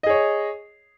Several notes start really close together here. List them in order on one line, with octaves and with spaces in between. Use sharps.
D#5 G#4 C#5